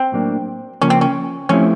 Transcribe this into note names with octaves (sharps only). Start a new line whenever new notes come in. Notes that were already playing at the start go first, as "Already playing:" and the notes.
Already playing: C4
A2 F#3 A#3 D4
C#3 F3 A#3 C#4
C4
C#4
F3 A3 C4 C#4 E4 G4